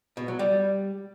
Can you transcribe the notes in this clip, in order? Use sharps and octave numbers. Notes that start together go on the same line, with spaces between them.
B2
F#3
G3